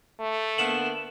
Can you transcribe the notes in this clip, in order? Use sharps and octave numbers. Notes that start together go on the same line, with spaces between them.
A3
D3 A#3 B3 E7 F#7